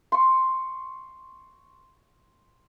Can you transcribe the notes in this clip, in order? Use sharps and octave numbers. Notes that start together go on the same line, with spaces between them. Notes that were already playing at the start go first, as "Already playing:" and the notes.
C6 C#6